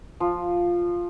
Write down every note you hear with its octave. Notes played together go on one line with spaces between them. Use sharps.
F3